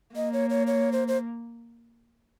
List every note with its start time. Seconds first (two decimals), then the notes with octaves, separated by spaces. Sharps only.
0.16 A#3 D#5
0.33 C#5
0.50 C#5
0.67 C#5
0.92 C5
1.08 C5